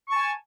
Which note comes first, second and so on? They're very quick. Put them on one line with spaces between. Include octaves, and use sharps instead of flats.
C#6 A5 G#5